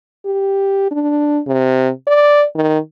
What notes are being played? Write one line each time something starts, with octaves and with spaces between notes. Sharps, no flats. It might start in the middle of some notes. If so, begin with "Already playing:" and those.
G4
D4
C3
D5
D#3